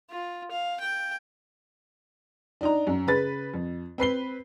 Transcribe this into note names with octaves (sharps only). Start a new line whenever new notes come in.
F4
F5
G5
D4 D#4 A#5
F#2
C#3 B4 A6
F2
C4 B4 C7 G7